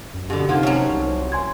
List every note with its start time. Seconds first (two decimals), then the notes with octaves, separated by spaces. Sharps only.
0.14 F#2
0.30 B2 D3 G4
0.49 C3 F3 A#3 D#4 F#5 G#6
0.63 F#3 C#4
0.89 C2
1.32 G#5 C6 G#6